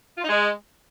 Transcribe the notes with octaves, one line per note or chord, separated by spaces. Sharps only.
F4
D#4
G#3